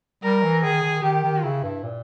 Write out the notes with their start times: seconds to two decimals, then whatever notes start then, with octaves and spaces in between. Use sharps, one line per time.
0.23 G3 A#4
0.43 E3
0.63 D#3 G#4
0.83 D#3
1.03 D#3 G4
1.24 D#3
1.43 C#3 E4
1.64 G2
1.84 A#2